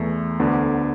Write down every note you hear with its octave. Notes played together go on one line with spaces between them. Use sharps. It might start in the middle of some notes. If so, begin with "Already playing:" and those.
Already playing: E2 E3 A3
D2 D3 B3